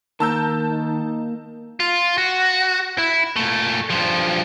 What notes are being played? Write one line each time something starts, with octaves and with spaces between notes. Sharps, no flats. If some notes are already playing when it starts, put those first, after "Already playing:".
D#3 A#3 A#4 A5 E6 G6
D#4
F4
F#4
E4
A#2 A3
G2 F3